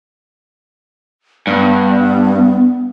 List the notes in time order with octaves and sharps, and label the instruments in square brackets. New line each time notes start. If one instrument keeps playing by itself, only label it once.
[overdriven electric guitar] G2 [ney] B3